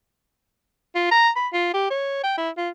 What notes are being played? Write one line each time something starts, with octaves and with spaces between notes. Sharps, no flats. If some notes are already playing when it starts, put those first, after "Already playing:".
F4
A#5
B5
F4
G4
C#5
G5
E4
F4